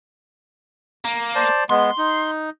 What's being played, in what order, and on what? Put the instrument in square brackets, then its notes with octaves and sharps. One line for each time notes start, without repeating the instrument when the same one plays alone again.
[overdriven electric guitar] A#3
[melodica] C5 D5 A5
[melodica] G#3 B3 [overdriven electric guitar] C6
[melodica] D#4